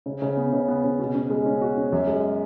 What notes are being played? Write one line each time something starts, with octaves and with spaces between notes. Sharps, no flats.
C#3
C#3
B3
C#3
B3
C#3
B2
C#4
G#3
C#4
F#4
C#4
F#2
G#3